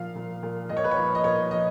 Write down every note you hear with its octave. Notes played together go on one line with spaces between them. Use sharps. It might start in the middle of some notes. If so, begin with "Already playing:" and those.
Already playing: A#2 F3 F5
A#2
A#2
A#2 D#5
C#5
B4
C#5
F3
D#5
A#2 C#5
F3 D#5